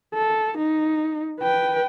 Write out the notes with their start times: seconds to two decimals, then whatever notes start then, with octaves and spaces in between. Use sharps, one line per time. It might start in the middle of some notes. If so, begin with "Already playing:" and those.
0.14 A4
0.57 D#4
1.40 B4 G5